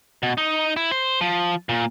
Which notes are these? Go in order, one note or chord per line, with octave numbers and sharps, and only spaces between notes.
B2
D#4
E4
C5
F3
A#2